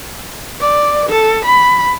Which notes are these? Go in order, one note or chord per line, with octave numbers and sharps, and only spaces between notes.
D5
A4
B5